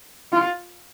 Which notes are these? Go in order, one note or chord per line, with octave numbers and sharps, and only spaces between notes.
F4